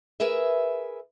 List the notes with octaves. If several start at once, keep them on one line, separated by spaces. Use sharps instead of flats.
G#4 A#4 B4 E5